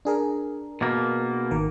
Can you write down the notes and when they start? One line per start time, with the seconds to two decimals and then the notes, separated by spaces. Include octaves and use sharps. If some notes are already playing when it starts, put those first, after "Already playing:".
0.05 D4 G#4 A#4
0.81 B2 A#3
1.51 G#1 D#3 A#4